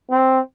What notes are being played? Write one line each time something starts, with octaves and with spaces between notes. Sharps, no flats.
C4